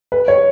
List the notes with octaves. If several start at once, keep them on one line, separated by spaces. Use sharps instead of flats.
B4
C#5